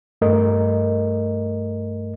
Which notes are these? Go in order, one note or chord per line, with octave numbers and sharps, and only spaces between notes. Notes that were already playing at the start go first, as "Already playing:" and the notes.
G2 A3 A#4 D#5